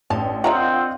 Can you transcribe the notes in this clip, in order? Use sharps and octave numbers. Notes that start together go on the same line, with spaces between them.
A1 D4 D5 G5 A5
C4 F4 A#4 C#5 D#5 F#5 A#5